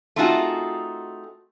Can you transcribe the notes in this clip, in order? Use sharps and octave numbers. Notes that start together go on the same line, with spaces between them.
A3 C4 D#4 F4 F#4 G#4